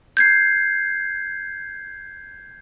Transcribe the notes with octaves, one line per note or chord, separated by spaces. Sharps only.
G6 G#6 C7